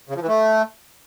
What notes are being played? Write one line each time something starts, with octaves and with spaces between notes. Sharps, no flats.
C#3
F3
E3
A3